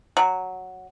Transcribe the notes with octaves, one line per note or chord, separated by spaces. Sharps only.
F#3